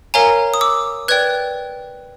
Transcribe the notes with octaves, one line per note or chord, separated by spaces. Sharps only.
A#4 C#5 F5 G#5 A#5
D#6
D6 E6
B4 D5 G5 F#6 G#6